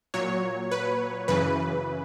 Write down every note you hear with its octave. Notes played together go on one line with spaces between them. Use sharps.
A#2 F#3 C#5
B4
F#2 C#3 E3 B4